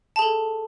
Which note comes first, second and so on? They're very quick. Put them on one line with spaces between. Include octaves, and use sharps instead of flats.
A5 G#4 A4